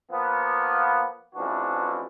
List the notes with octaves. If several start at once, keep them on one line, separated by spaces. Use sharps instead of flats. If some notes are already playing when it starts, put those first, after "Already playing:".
F3 A#3 B3
A1 F2 E3 D4 F#4